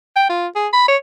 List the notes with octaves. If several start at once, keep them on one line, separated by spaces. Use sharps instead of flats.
G5
F4
G#4
B5
C#5